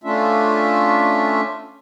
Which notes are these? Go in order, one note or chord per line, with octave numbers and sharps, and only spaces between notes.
A3 C#4 D4 F4 E5